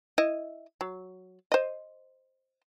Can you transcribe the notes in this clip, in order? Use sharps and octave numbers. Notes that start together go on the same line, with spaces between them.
E4 D#5
F#3
C5 D#5